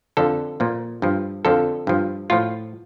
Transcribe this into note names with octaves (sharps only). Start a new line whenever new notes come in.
F2 D3 F3 A4
A#2 F3
G2 F3
F2 D3 F3 A4
G2 F3
A2 F3 F4